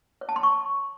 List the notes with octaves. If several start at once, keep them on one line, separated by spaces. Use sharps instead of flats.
C#5
A5
C6
C#6